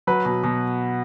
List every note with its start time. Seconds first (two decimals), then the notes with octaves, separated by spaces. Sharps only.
0.07 F#3 B4
0.25 B2
0.44 B2